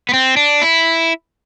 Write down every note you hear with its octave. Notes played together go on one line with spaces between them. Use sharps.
B3
C4
D4
E4